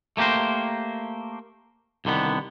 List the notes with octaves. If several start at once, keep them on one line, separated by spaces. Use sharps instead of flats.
A3 A#3 G4 A#4 C5
C2 D3 D#3 B3